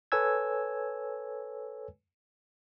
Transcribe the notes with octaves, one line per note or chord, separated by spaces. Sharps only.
A4 B4 C#5 G#5 E6 G#6